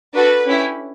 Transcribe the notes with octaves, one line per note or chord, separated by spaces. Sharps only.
D4 F#4 A4 B4
C#4 E4 G4